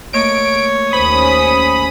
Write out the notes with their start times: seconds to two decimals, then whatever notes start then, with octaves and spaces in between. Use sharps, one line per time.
0.13 A3 A#3 C#5 D#5 D7
0.93 D#2 C#4 C5 B5 D#6